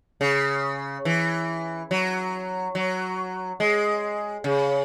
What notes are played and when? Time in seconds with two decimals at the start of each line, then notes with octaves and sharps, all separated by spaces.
0.21 C#3
1.05 E3
1.91 F#3
2.75 F#3
3.60 G#3
4.44 C#3